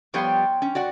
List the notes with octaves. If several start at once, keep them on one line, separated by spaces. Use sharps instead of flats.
F3 G3 B3 C#5 G5 C6
C#4
F#4 D5 F#5